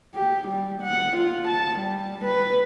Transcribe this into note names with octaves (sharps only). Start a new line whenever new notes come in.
G4
G3
F#5
F4
A5
G3
B4